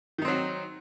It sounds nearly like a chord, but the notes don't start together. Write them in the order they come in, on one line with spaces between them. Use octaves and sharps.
D#3 D#4 C4 F#3